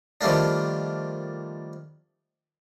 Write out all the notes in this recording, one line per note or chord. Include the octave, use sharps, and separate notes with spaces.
D#3 F3 G3 A3 A#3 D4